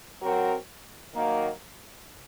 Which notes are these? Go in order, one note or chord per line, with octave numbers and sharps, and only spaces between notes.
F#3 C4 F#4 A#4
D#3 F#3 A#3